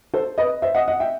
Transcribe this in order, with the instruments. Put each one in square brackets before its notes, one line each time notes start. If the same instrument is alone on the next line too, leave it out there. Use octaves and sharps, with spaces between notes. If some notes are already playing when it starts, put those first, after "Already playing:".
[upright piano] A4 C5
B4 D#5
C5 E5
D#5 F#5
D#5 F#5
E5 G5